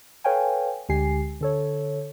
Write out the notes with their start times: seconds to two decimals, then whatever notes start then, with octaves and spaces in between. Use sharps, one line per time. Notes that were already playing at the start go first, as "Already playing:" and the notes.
0.24 A4 B4 C#5 F5 G5 G#5
0.89 D2 D3 G#3 G4 G#5 C7
1.41 D3 A4 C#5